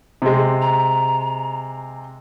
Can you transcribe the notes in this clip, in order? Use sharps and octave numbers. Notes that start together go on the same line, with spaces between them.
C3 G#3
A#5